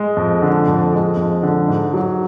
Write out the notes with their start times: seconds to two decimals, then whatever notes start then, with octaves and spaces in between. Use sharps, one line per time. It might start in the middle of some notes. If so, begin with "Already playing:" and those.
Already playing: G#3
0.17 F2
0.42 D3
0.68 F2
0.93 G#3
1.17 F2
1.43 D3
1.68 G#2
1.94 F#3